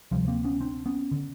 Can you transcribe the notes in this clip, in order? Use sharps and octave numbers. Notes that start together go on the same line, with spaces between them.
D2 C3 F3 G3
A#3 C4
B3 C#4
C4 D4
B3 C#4
D3